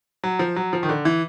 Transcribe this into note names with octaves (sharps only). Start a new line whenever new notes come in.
F#3
F3
F#3
F3
D#3
D3
E3